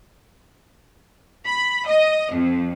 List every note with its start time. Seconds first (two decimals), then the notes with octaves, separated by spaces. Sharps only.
1.45 B5
1.86 D#5
2.32 F2